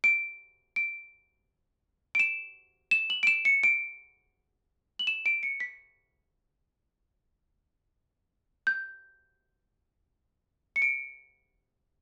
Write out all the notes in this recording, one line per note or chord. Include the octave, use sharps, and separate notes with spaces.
D7
D7
D7
E7
E7
F#7
D7
E7
C#7
D7
F#7
E7
D7
C#7
B6
G6
C#7
D7